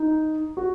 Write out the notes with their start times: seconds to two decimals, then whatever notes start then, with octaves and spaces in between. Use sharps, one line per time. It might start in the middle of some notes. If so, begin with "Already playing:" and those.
Already playing: D#4
0.57 F#4